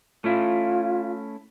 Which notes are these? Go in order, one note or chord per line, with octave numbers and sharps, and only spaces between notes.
A3 C#4 E4 F4